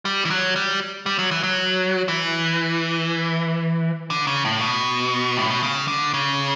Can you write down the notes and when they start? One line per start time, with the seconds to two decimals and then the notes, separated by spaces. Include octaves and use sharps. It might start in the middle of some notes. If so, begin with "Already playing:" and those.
0.05 G3
0.25 E3
0.30 F#3
0.56 G3
1.06 G3
1.19 F#3
1.31 E3
1.43 F#3
2.08 E3
4.10 D3
4.27 C#3
4.45 A2
4.61 B2
5.37 A2
5.50 B2
5.63 C#3
5.88 D3
6.14 C#3